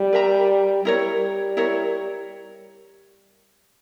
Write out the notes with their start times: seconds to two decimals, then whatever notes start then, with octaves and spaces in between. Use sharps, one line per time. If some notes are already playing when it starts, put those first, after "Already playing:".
Already playing: G3
0.13 A#4 E5 A#5
0.84 G3 E4 A#4 C#5
1.57 E4 A#4 C#5